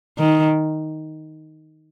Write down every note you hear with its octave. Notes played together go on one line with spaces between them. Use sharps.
D#3